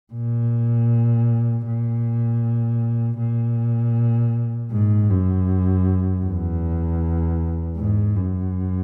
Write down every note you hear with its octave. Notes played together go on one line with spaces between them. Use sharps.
A#2
A#2
A#2
G#2
F#2
E2
G#2
F#2